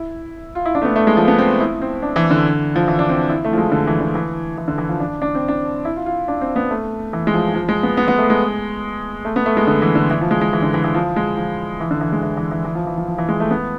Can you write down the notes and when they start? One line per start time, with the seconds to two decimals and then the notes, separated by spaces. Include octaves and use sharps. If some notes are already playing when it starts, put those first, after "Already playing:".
Already playing: E4
0.55 F4
0.65 E4
0.75 D4
0.82 A3
0.85 B3
0.96 A3
1.07 G#3
1.17 F3
1.28 B3
1.39 C4
1.60 E4
1.82 C4
2.02 D4
2.16 E3
2.31 D3
2.76 F3
2.88 E3
2.99 D4
3.09 C4
3.29 E4
3.45 A3
3.53 F3
3.58 G#3
3.72 D3
3.87 E3
4.01 D3
4.15 E3
4.58 E3
4.68 D3
4.78 E3
4.89 F3
5.00 D4
5.22 D4
5.35 C4
5.48 D4
5.85 E4
5.96 F4
6.06 F4
6.28 D4
6.41 C4
6.56 B3
6.70 A3
7.13 E3
7.27 G#3
7.34 F3
7.54 F3
7.69 G#3
7.83 B3
7.97 B3
8.08 B3
8.18 A3
8.30 G#3
9.25 A3
9.36 B3
9.46 A3
9.57 G#3
9.67 D3
9.82 E3
9.95 D3
10.10 E3
10.21 F3
10.31 G#3
10.41 G#3
10.53 E3
10.63 D3
10.74 E3
10.84 E3
10.95 F3
11.16 G#3
11.38 F3
11.80 E3
11.91 D3
12.01 E3
12.12 G#3
12.22 E3
12.37 E3
12.51 E3
12.65 E3
12.75 F3
12.87 E3
12.98 F3
13.08 F3
13.18 E3
13.29 G#3
13.40 A3
13.51 B3